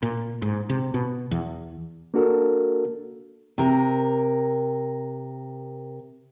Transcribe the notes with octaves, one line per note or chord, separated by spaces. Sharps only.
A#2
G#2
C3
B2
E2
A#3 D4 F#4 A4 A#4
C3 A#4